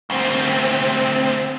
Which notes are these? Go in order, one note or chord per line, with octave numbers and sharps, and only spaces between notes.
D2 C4